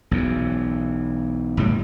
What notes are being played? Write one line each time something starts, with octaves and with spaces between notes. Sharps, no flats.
B1 E2
F#1 A2 G3